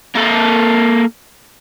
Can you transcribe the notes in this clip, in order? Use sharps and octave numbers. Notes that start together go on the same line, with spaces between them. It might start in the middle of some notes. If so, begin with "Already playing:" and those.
A#3 A4